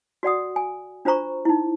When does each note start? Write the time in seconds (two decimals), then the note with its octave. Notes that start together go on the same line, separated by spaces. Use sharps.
0.23 F#4 D5 F#5 D#6
0.56 G#5
1.05 D4 F4 C5 A#5 C#6
1.45 D#4 E4